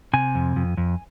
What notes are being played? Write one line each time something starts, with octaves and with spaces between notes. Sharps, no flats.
C3 G#5
F2
F2
F2